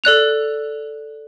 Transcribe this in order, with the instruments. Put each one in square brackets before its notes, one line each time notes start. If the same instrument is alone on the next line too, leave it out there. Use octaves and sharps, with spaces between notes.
[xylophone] A4 D5 F#6 F7